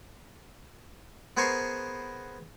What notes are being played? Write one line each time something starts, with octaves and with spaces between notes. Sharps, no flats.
B3 G#4 A#4 C5 C6 C#6